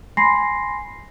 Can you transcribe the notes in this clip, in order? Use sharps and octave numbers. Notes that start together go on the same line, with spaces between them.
G#5 B5 C6 A#6 C7